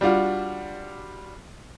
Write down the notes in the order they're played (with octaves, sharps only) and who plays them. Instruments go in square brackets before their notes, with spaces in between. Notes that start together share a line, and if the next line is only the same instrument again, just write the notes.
[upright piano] G3 D4 F4 F#4